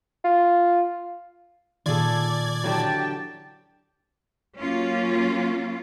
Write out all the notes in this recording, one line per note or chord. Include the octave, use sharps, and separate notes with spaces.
F4
A#2 D#3 F4 G#4 A4 D5 G#6
D3 E3 F#3 G4 G5 A5
F#3 A#3 C#4 F4